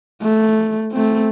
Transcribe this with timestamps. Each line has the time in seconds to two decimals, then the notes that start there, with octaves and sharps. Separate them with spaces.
0.22 A3
0.92 A3 C4